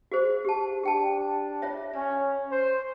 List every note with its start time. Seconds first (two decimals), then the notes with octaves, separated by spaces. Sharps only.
0.12 F#4 G#4 C5
0.45 G4 A5
0.83 D4 G4 G5 A5
1.62 F4 C#5 E5
1.95 C#4
2.51 C5